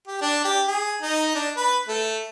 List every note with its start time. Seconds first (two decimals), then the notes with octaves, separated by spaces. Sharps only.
0.07 G4
0.21 D4
0.44 G4
0.68 G#4
1.02 D#4
1.35 D4
1.56 B4
1.88 A3